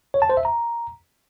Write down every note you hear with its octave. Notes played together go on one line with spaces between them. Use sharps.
C#5
A5
C5
E5
A#5